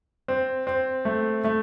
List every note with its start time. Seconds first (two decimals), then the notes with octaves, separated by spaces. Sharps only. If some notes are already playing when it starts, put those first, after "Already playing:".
0.28 C4
0.67 C4
1.05 A3
1.44 A3